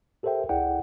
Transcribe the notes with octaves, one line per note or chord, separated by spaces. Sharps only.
G4 A4 A#4 C5 E5 G5
C#2 E4 G#4 D5 F#5 G5